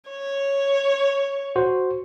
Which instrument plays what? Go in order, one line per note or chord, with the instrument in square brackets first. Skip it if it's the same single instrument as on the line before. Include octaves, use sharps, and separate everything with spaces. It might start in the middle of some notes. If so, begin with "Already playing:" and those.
[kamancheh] C#5
[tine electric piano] F#4 C5